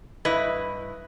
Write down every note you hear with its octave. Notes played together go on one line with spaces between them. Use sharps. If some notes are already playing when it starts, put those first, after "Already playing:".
G2 E4 B4 D#5